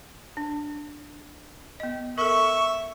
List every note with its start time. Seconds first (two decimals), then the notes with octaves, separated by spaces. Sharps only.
0.37 D4
1.80 B3 D#5
2.18 A4 A#4 E5 C#6